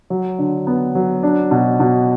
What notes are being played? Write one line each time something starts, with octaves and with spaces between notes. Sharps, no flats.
F#3
D3
B3
F#3
D4
B2
B2